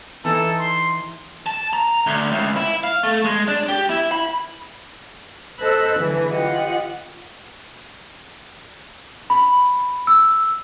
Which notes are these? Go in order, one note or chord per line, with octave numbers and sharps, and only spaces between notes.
E3 D#4 E4 A4
C6
A5
A#5
D2
C#2
E4
F5
A3
G#3
D4
G4
E4
B5
A4 C5 D#5 B5 E6 F#6
D3 E3 F#3 G#4
F4 G4 D#5 F#5
B5
E6